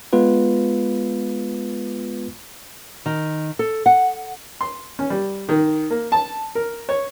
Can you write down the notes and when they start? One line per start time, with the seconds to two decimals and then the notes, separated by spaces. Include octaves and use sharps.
0.13 G#3 B3 F4 B4
3.06 D#3
3.59 A4
3.86 F#5
4.61 C6
4.99 C#4
5.10 G3
5.49 D#3
5.90 A#3
6.12 A5
6.55 A#4
6.89 C#5